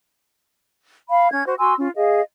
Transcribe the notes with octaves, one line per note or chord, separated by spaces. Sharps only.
F5 B5
C#4 G#6
F#4 C5
F#4 G#5 C6 E6
C#4 F4
G#4 D#5 F5